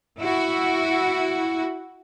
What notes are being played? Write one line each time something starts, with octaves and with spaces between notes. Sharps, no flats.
E4 F#4